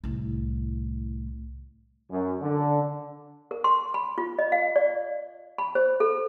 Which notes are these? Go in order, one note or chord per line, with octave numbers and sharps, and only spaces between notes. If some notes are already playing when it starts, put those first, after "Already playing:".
C2 A2
F#2
D3
A#4
C6
B5
F4
D#5
F5
D5
B5
C5
A4